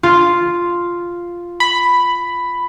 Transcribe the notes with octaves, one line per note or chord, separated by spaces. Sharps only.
F4
B5